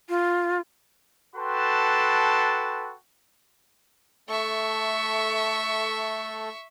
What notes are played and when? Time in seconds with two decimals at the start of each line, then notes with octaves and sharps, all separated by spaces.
0.09 F4
1.36 F#4 A4 B4 G5 A5 C6
4.29 A3 A4 E5 C#6